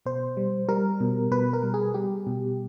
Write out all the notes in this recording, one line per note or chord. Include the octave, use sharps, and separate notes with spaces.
B2 C5
G3
G3 A#4
B2
B2 B4
A#4
G3
G#4
G3 G4
B2